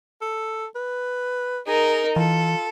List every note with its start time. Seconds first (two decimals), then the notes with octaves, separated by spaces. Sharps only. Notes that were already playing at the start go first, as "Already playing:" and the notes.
0.22 A4
0.75 B4
1.67 D#4 G#4 A#4
2.16 E3 F4 A4